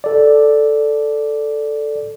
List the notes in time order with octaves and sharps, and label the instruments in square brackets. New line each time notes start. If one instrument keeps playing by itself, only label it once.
[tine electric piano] A4 D5